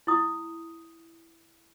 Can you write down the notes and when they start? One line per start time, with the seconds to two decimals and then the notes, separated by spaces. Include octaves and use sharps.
0.07 E4 D#6